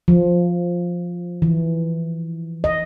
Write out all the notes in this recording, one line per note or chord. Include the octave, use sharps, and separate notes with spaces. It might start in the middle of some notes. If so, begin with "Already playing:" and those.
F3
E3
D#5